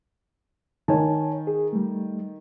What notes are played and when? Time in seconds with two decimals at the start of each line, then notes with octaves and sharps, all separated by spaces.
0.88 D#3 C#5 G#5 A5
1.47 G#4
1.73 G3 A3